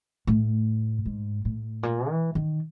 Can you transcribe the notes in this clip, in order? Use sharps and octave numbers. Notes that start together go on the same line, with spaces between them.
A2
G#2
A2
A#2
E3
D#3